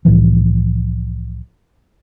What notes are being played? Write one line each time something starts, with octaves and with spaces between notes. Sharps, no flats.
C2 A2 E3 F3